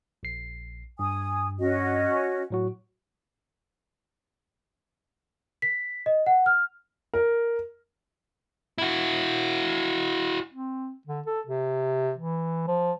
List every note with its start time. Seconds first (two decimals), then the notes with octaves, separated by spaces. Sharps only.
0.23 A#1 C7
0.99 G2 G#5 D#6
1.60 C#4 F#4 D#5
2.50 A2 F#3 F#4
5.62 B6
6.06 D#5
6.26 F#5
6.46 F6
7.14 A#4
8.78 E4 F#4
10.54 C4
11.07 D3
11.26 A4
11.47 C3
12.18 E3
12.68 F3